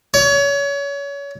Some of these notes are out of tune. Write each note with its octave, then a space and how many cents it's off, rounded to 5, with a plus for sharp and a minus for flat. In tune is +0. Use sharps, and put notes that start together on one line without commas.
C#5 +30